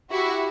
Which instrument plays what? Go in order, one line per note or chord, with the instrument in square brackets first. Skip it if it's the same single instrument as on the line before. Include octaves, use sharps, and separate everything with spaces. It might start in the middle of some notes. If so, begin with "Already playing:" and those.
[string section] E4 F#4 [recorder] G4